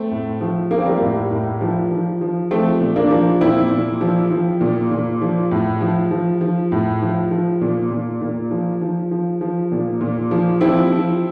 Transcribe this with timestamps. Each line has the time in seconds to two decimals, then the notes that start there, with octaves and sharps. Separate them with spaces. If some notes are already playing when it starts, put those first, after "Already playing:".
Already playing: A3 C4
0.11 A2
0.41 F3
0.71 F3 A#3
0.78 C4
0.86 G3 A#3
1.01 A2
1.31 A2
1.61 F3
1.91 F3
2.21 F3
2.51 F3 A3 C4
2.80 A#2
2.96 A#3 D4
3.11 F3
3.41 A#2 C4 E4
3.72 A#2
4.01 F3
4.30 F3
4.61 A#2
4.91 A#2
5.22 F3
5.51 A2
5.81 F3
6.11 F3
6.41 F3
6.72 A2
7.02 F3
7.31 F3
7.61 A#2
7.91 A#2
8.21 A#2
8.51 F3
8.81 F3
9.11 F3
9.41 F3
9.72 A#2
10.01 A#2
10.31 F3
10.61 F3 C4 E4
10.92 F3